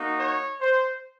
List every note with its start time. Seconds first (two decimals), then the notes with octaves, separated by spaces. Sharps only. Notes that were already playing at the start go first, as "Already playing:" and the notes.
Already playing: A#3 D#4 F#4
0.19 C#5
0.61 C5